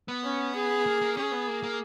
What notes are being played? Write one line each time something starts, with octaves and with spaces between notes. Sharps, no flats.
B3
C#4
G#4
A#3
A#3
C#4 G#4
B3
A#3
A#3